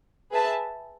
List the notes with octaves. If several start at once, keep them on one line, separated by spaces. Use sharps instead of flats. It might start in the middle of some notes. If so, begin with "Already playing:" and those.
G#4 B4 E5 A5